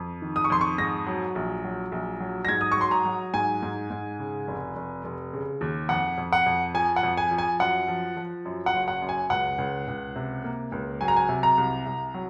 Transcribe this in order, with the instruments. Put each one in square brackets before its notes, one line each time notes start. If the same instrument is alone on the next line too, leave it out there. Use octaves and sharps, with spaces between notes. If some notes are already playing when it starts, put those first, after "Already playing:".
Already playing: [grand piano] F2
D#3
D#6
C#6
F2 C6
C#6
G#2 A#6
F#3
A#1
F#3
A#1
F#3
A#6
G#2 G#6
D#6
C#6
F#3 C6
A#5
F#3
G#2 G#5
G#2
G#2
C#3
F1
F1
F1
C#3
D#2
F2 F#5
F2
F#5
F2
F3 G#5
F#5
F2
G#5
F3
G#5
F#2 F#5
F3
F3
F#2
F#5
F#1
F#5
F#2
G#5
C#2 F#5
C#2
C#2
C3
A#3
C#2
F#3 G#5
A#5
G#5
C3
A#5
C2
C2
F#3